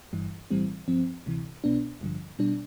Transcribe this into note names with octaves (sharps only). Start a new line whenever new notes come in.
G1 G2 E3
B1 A2 E3 G3 C4
G2 F3 C4
D2 C3 E3
C2 B2 B3 D4
A1 G2 D3 F3
B2 G3 D4